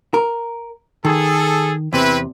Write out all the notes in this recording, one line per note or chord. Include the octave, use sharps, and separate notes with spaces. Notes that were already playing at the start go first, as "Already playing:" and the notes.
A#4
D#3 G#4 A4
E2 C3 C4 E4 B4